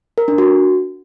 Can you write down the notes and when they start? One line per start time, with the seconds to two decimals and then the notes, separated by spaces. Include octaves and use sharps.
0.18 A#4
0.28 D4
0.38 F#4